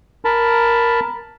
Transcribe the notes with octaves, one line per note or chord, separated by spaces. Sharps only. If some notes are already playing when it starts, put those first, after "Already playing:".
A#4 A5 B5